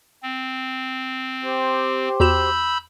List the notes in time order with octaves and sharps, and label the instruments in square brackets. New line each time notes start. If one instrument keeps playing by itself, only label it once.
[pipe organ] C4
[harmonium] G4 C5
[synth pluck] E2 F#4 E7 [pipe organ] B5 E6 G6